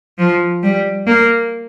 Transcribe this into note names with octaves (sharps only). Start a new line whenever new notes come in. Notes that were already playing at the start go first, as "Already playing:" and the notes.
F3
G3
A#3